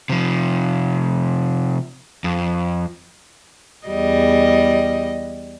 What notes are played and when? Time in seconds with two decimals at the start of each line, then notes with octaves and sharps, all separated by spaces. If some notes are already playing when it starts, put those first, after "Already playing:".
0.09 C3 F3
2.24 F2
3.87 E2 G3 D#5